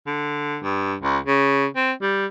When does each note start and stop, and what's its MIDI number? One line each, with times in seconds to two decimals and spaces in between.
0.07 0.57 50
0.63 0.95 43
1.03 1.18 37
1.26 1.66 49
1.76 1.92 60
2.02 2.26 55